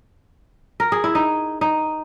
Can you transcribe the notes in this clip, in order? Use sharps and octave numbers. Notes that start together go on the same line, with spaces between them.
A#4
G#4
E4
D#4
D#4